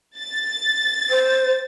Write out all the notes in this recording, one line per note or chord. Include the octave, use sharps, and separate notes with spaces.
A6
C5